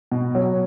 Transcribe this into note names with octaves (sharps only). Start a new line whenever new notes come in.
B2
F#3